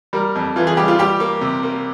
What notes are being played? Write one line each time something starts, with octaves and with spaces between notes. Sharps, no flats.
G3 A#4
F2
E3 F4
G#4
G3 G4
F4
G3 G4
A#3
C3
A#3